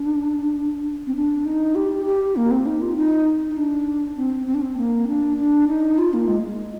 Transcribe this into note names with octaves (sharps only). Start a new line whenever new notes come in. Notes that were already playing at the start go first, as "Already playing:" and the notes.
Already playing: D4
C4
D4
D#4
G4
G4
A#3
C4
D#4
F4
D#4
D#4
D4
C4
C4
D4
C4
A#3
D4
D4
D#4
F4
A#3
G#3
G#3